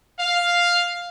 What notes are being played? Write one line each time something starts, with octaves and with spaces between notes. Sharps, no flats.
F5